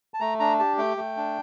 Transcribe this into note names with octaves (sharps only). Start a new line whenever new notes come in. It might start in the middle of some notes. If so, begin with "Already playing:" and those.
A5
A3 A#5
D4 A#5
G4 A5
A3 G5
A3
D4